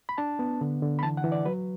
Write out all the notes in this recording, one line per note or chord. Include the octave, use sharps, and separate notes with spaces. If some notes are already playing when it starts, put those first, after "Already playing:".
B5
D4 A5
B3
D3
D3
B5
E3 A5
F#5
E3
D5
F#3 B4